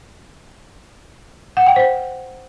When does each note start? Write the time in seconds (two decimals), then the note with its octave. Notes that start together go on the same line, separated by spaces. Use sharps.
1.57 F#5
1.66 G5
1.76 C5